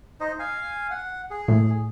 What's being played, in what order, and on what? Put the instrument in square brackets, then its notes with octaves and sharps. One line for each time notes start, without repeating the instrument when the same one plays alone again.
[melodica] D#4 C5 D#5
F5 G#5
F#5
G#4
[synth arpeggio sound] A2